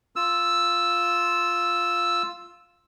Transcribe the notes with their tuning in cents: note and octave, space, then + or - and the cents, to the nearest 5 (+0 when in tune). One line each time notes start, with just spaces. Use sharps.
F4 +0 E6 +0